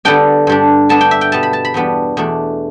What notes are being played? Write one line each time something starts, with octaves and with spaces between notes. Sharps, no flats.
D3 G3 B3 D4 G5
G2 G3 D4
D3 B3 D4 A5
G5
E5
G5
B2 G3 B3 A5
B5
A5
B5
E2 B2 G3 B3 D4
E2 B2 A3 D4